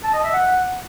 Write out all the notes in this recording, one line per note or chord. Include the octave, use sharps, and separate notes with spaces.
A5
D#5
E5
F#5